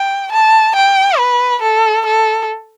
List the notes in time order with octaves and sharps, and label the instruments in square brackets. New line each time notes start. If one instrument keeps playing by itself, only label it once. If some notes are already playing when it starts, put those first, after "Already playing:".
Already playing: [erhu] G5
A5
G5
B4
A4
A4